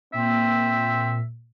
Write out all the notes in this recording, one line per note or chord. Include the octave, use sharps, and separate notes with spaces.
A#2 C4 E5